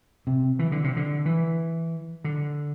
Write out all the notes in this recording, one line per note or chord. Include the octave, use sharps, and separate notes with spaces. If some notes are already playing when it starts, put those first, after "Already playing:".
C3
E3
D3
C3
D3
E3
D3